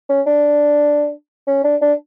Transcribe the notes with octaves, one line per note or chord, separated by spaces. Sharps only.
C#4
D4
C#4
D4
D4